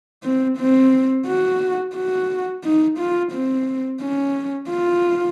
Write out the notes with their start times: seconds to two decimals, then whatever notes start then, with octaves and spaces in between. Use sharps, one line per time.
0.24 C4
0.58 C4
1.27 F#4
1.95 F#4
2.64 D#4
2.99 F4
3.33 C4
4.01 C#4
4.70 F4